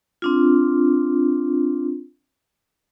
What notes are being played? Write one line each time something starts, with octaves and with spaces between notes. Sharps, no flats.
C4 D4 F4